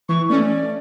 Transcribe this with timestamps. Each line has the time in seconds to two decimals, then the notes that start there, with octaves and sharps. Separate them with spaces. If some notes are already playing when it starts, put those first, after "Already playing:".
0.09 E3 C#6
0.30 A3 C#4 D5